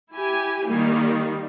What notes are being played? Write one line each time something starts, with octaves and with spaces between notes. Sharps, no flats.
E4 G4 G#5
D#3 G3 A#3